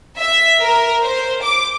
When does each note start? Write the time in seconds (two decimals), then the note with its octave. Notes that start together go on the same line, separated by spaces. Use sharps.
0.19 E5
0.62 A#4
1.03 C5
1.43 D6